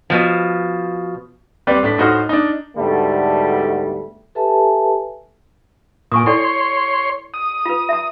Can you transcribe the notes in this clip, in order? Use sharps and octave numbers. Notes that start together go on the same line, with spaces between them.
B2 F3
G3 C4 B4 D5
A2 D4 B6
A2 D#4 F#4 C5 F6
D4 D#4
D2 G#2 B2 D3 G3 A3
G4 A4 B4 E5 G#5 A5
A#2 G#5 C#6 D#6
E4 A4 C#5 D5 C6
D#6
F4 B4
E5 A#5